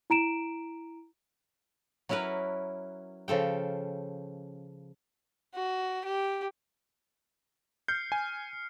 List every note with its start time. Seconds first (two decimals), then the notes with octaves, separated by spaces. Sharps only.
0.10 E4 A#5 D7 E7
2.09 F#3 C#4 E4 A#4 B4
3.28 C#3 F3 A4 G5
5.55 F#4
6.05 G4
7.88 F6 G6 C7 C#7
8.12 G#5